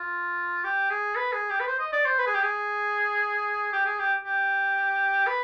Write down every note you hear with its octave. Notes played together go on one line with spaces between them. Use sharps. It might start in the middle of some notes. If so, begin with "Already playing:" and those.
Already playing: F4
G4
G#4
B4
G#4
G4
B4
C5
D#5
D5
C5
B4
G#4
G4
G#4
G4
G#4
G4
G4
B4